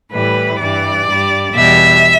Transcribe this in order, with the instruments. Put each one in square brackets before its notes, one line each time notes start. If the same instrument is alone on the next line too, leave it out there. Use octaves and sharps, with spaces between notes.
[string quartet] A2 E3 G3 B4
G2 E3 G3 D5
G2 G3
E2 B2 G3 E5